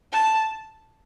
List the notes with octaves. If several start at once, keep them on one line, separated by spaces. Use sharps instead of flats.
A5